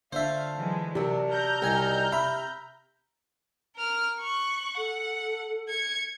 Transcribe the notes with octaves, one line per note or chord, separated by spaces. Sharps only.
D3 A3 F4 C5 E5 F5
E3 F#3 G#3
C3 F#3 D4 A#4
A#5 F6 G6
C2 F#3 D4 D#4 G#5
C3 E5 B5
A#4 F6
C#6 F#6
A4 F#5
G#6 C#7